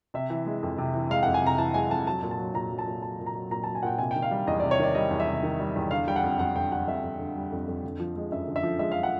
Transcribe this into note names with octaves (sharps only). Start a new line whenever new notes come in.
C3 E5
E3
G#3
F2
C3
E3
G#3 F5
F2 F#5
G#5
C3 A#5
E3 A5
G#3 G#5
F2 A5
F#3 A5
A#2
A5
F#3
A#2 A#5
F#3
A5
A#2
F#3 A5
A#2
A#5
F#3
A#2 A#5
F#3 A5
G#5
A#2 F#5 G5
C3 G#5
D#3 G5
F5
G3
E2 D#5
C3 D5
C#5
D#3 D5
G3 D#5
E2
E5
C3
D#3
G3
E2
D3 F5
G3 G5
F#5
F2
F2 F#5
D3 G5
G3 F#5
F2 E5
F2
D3
G3
F2
F2
D3
F3
G#3
F#2 E5
D3
E5
F3
G#3 E5
F5
F#5